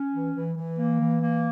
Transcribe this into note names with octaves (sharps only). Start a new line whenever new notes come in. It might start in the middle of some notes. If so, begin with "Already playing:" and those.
Already playing: C#4
E3
E3
E3
A#3
E3
A#3